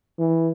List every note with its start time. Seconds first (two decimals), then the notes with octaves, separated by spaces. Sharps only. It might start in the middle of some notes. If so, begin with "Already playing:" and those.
0.19 E3